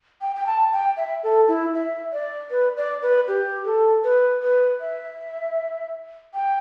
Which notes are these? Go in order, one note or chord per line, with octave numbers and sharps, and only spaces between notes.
G5
G5
A5
G5
E5
A4
E4
E5
D5
B4
D5
B4
G4
A4
B4
B4
E5
G5